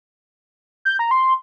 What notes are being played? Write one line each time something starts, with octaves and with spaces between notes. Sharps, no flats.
G6
A#5
C6